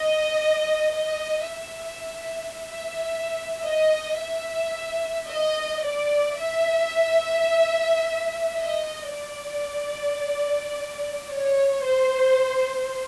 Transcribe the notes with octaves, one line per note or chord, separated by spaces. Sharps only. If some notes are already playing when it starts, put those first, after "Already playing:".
Already playing: D#5
D#5
E5
E5
D#5
E5
D#5
D5
E5
D#5
D5
C#5
C5